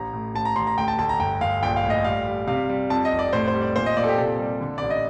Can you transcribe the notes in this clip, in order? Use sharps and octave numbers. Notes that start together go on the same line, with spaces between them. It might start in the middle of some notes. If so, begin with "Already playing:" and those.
Already playing: A1 A#5
A2
A1 A5
A#5
A1 C6
A#5
D2 G5
A5
D2 A5
A#5
G1 G5
G1 F5
A#1 G5
F5
A2
D#5
G3 F5
G3
C3 F5
G3
F2 A5
D#5
F1
D5
A2 C5
C5
G3
D5
A#2 C5
D#5
A#2 D5
A4
G4
C3 A4
G3
D3
A1 D5
D#5